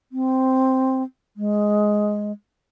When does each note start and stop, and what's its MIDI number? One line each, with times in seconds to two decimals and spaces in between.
0.12 1.03 60
1.37 2.32 56